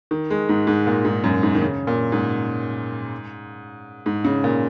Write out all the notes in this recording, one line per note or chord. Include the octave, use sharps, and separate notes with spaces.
D#3
G#3
G#2
G#2
A#2
G#2
F#2
G#2
D#3
C#3
A#2
G#2
G#2
C#3
A#2